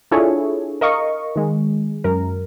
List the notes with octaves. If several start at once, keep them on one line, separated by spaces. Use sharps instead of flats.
D4 E4 F4 G#4 A4 C#5
A#4 D#5 F5 C#6
D#3 G#3
F#2 A#4